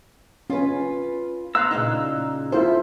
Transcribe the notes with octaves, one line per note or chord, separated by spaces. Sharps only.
C#4 F4 B4
B3 F5 A#5 C6 E6 F#6
A#2 C#3 D#4
E4 F4 A4 C5